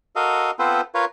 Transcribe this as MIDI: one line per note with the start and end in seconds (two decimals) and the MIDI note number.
0.16 0.51 66
0.16 0.51 69
0.16 0.51 70
0.16 0.51 75
0.16 0.51 77
0.59 0.81 59
0.59 0.81 60
0.59 0.81 65
0.59 0.81 69
0.59 0.81 71
0.59 0.81 72
0.95 1.05 65
0.95 1.05 70
0.95 1.05 71
0.95 1.05 73
0.95 1.05 77